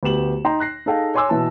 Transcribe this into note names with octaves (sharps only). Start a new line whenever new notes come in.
D2 B3 G4 E7 F#7
D#4 G5 A#5 C6
F#6 A#6 C7
D#4 G#4 A4 F5 G5
C#5 G#5 C6 D6 E6
B2 E3 A5